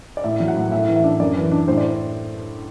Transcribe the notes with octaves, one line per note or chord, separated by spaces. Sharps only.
D5
A2 E5
F#3
F#5
A2
A2 E5
E3
E5
D4
F#2 D5
E3
D4
A2 C5
D5